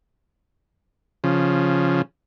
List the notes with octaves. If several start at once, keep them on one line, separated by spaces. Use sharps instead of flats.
C#3 F3